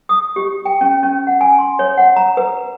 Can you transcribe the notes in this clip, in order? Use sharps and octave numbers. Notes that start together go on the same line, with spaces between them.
D#6
G4
G5
C#4
C#4
F#5
G#5
C6
C#5
F#5
A#5
B4